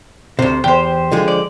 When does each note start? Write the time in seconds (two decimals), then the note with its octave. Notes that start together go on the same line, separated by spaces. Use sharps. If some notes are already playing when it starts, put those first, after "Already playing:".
0.39 D2 C3 C5
0.64 E2 G4 C5
1.12 D3 F3 G#3
1.28 D5